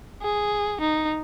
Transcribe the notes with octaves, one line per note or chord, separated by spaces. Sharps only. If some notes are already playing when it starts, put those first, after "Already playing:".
G#4
D#4